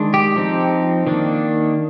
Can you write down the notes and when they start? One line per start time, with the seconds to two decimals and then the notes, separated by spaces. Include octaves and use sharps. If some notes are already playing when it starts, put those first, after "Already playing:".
Already playing: D#3 G#3 D4
0.14 G4
0.36 F3 C4 D#4
1.07 D#3 A#3 D4